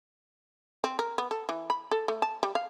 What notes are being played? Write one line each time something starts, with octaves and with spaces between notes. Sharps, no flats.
C4
A#4
B3
A4
E3
B5
A4
A3
A5
G3
F5